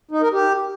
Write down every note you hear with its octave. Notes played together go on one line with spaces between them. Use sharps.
D#4
A#4
G4